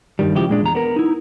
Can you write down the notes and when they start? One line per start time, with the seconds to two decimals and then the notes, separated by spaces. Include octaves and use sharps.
0.19 G2 D#3 G3
0.35 C#3 F3 G#3 E4 G4
0.50 A#2 G#3 D4
0.62 E2 A#5
0.75 B3 A#4
0.96 D#4 E4